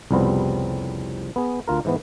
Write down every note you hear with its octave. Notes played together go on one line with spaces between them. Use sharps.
C2 F2 C#3 G3 B3 C4
B3 G#4
D2 F4 A#4
G#2 E3 B3